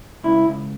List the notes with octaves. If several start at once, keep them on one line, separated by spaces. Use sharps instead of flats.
C#2 E4
C#2